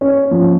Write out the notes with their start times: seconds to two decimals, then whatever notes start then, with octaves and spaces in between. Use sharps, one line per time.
0.01 C#4
0.31 F3